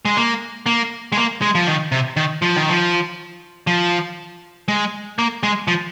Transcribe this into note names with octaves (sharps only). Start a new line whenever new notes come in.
G#3
A#3
A#3
G#3
A#3
G#3
F3
D#3
C3
D#3
F3
D#3
F3
F3
G#3
A#3
G#3
F3